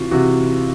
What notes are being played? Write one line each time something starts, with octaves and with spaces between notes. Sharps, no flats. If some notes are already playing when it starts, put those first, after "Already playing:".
Already playing: C3 E3 F4 F#4
C3 E3 F#4